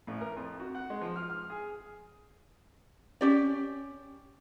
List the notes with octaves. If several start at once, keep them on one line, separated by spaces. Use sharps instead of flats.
A1
A#4
F2
F#4
F#5
G#3
F3
F6
F6
G#4
C#4 G4 D5